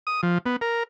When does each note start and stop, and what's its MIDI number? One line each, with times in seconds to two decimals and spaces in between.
0.07 0.21 87
0.23 0.38 53
0.46 0.56 59
0.61 0.83 70